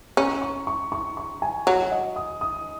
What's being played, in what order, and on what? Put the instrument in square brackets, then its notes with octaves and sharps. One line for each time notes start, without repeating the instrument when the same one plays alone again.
[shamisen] C#4 [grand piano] A#5
[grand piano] C#6
C#6
C#6
C#6
G#5
[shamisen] F#3
[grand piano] D#5
D#6
D#6